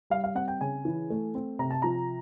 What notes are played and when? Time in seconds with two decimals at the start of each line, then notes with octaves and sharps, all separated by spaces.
0.10 G3 F5
0.24 F5
0.35 C4 F#5
0.48 G5
0.61 C#3 G#5
0.85 E3
1.10 A3
1.35 C4
1.59 C3 A#5
1.71 A5
1.82 F3 A#5